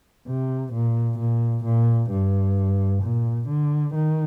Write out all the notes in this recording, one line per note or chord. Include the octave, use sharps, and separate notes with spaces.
C3
A#2
A#2
A#2
G2
A#2
D3
D#3